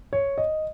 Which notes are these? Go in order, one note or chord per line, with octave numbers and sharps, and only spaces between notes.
C#5
D#5